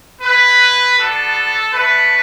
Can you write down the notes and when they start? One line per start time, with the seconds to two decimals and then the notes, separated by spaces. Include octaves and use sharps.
0.22 B3 E4 B4
0.97 B3 D4 F#4 A4
1.72 A3 D4 F#4 B4